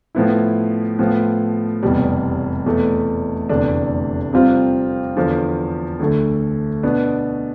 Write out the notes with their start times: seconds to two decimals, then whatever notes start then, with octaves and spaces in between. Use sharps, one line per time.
0.15 A2 F3 B3 E4
0.99 A2 F3 B3
1.83 F1 E2 B2 G3
2.66 E2 B2 A3
3.49 F1 E2 D3 A3 D4
4.32 F2 C3 G3 C4 F4
5.16 E2 D3 F3
6.00 D2 D3 A3
6.83 B2 B3 D4